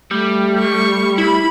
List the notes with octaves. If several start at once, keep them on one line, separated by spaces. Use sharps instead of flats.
G3 A3
C#6
E4 B5